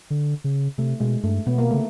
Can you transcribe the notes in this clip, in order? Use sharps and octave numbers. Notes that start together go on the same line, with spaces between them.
D3
C#3
C3 A3
B2 G#3
G2 A3
B2 B3
A#3
C#3 A3